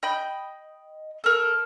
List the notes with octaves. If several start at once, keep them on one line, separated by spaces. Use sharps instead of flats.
D#5 G5 B5 G6
A4 A#4